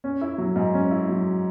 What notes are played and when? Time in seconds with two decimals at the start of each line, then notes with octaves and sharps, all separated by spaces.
0.04 C#4
0.21 E4
0.38 F#3
0.56 G#2
0.74 C#4
0.91 E4
1.09 F#3